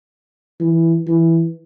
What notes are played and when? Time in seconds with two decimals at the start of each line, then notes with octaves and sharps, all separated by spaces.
0.60 E3
1.07 E3